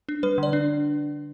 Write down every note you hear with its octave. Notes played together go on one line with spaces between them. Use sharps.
D4
G3 B4
D3 D5
D4